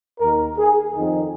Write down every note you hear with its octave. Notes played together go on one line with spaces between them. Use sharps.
D#2 D#3 A#4
G#4
F2 D#3